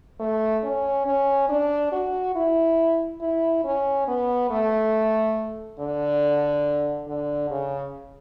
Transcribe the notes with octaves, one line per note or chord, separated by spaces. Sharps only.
A3
C#4
C#4
D4
F#4
E4
E4
C#4
B3
A3
D3
D3
C#3